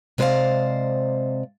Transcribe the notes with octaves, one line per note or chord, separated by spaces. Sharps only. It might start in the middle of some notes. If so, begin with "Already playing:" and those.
C3 G#3 B4 C5 D5 F5